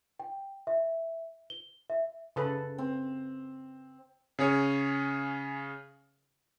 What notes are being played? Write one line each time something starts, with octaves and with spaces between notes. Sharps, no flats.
G5
E5
G7
E5
C#3 A4 B4
C4
C#3 C#4 G#4 C#5